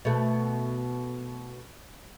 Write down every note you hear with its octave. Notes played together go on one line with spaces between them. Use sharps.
B2 A3